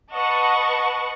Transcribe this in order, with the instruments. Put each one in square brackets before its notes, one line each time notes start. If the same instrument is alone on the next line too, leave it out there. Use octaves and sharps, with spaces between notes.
[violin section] B4 D#5 F#5 A5 C#6